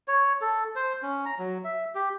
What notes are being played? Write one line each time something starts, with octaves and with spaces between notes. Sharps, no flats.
C#5
A4
C5
C#4
A#5
F#3
E5
G4